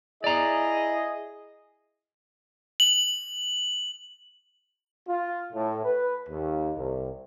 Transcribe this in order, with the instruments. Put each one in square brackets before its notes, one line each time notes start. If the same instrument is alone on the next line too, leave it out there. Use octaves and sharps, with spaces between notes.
[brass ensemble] E4 G#4 D#5 [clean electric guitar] D5 A#5
[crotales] F#7
[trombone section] F4
A2
B4
D#2
C2